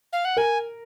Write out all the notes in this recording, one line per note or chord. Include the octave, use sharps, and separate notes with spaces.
F5
F#5
A#4 G#5